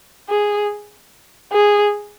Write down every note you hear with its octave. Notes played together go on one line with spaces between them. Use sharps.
G#4
G#4